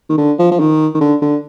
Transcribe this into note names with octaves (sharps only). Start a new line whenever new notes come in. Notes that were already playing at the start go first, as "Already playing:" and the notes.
D#3
D3
F3
F3
D#3
D#3
D3
D3